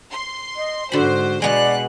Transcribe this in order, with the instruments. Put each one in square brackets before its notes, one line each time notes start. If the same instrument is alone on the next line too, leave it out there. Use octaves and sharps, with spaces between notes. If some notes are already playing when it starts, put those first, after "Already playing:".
[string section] C6
[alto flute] D#5
[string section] G#2 C5 [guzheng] D3 B5 [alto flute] F#4
[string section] B2 F#6 [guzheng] G#3 B3 B4 [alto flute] D5